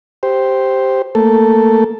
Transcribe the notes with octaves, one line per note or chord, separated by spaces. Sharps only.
G4 C5
A3 A#3 A4